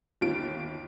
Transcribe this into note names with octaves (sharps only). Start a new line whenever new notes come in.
G1 D#2 D#3 F4 D7